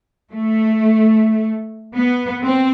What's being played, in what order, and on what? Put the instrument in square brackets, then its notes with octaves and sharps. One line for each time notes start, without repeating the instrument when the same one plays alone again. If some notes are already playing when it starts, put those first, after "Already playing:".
[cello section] A3
B3
C4